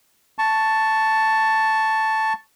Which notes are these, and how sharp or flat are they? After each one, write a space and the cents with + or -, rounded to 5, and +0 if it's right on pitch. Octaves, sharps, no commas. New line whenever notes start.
A5 +0 C#6 +0